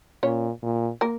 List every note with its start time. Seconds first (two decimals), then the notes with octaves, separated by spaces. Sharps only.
0.23 A#2 C#4 C#5
0.63 A#2
1.01 A#3 A#4